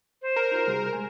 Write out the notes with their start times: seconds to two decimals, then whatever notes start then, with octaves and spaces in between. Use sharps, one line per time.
0.22 C5
0.36 A#4
0.51 D#4 F4 F#4
0.67 C3 G3 G#4
0.93 C2 G#3 G#5